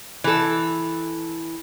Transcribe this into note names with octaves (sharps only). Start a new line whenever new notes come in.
E3 A4